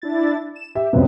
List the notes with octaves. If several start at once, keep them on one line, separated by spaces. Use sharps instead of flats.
D4 E4 A6
E7
G4 E5
C#2 F#2 C3 B3 C4 B4